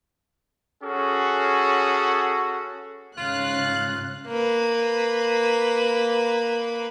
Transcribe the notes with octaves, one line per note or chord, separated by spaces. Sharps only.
C#4 F#4 G#4 A4
G#2 C#3 F4 F5 F#6
A#3 B4